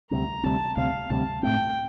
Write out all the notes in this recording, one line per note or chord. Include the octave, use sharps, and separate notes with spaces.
D2 C3 G3 C4 A#5
D2 C3 G3 C4 A5
D2 C3 G3 C4 F5
D2 C3 G3 C4 A5
A2 A3 C4 G5